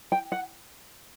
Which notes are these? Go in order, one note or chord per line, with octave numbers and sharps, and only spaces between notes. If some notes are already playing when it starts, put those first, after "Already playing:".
G5
F#5